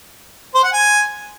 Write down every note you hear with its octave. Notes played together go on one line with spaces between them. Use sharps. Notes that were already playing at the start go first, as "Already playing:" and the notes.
C5
F#5
G#5